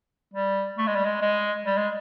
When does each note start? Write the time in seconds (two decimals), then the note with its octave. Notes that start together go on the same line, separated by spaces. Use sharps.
0.34 G3
0.78 A3
0.87 G#3
0.95 G3
1.05 G#3
1.22 G#3
1.66 G3
1.77 G#3